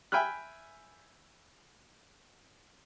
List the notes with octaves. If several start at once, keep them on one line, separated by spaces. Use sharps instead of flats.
E5 G5 G#5 B5 F6 F#6